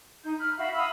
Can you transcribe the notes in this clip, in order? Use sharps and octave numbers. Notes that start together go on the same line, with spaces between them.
D#4 G6
B5 F6
F#4 E5 F5 B5
F5 B5 D#6 E6